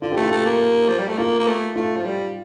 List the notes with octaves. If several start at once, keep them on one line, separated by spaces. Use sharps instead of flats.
D3 F4
G4
A3
F4
A3
A#3
F3
G3
A3
A#3 F4
A#3
A3
A3 F4
F3
G3